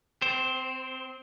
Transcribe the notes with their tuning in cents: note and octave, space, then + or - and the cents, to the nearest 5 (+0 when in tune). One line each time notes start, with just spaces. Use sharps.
C4 -20 C5 +10